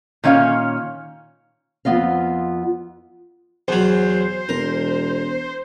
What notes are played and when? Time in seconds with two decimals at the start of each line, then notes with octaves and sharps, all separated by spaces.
0.24 A#2 D#3 C#4 C#5 F5
1.85 F2 B3 F4 D#5 F5
3.68 E2 F#3 C5
4.49 E1 A#4